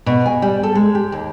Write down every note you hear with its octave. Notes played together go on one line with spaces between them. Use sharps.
B2
G#5
G3
A4
G#3
G4
D#2